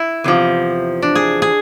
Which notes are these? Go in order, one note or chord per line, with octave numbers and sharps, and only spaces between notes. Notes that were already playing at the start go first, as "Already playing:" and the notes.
Already playing: E4
E2 C3 F3
D4
G#4
G#4